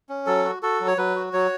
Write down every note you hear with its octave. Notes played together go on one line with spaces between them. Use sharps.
C#4
F#3 A4
F#4
F#4 A4
F#3
C#5
F#3 B4
F#4
F#3 C#5